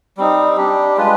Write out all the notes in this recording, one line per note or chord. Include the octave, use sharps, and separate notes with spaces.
G3 C4 D#4
G3 D4 G4
G#3 D4 F4 B4